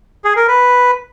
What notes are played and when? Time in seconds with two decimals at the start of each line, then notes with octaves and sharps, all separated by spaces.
0.24 G#4
0.36 A#4
0.48 B4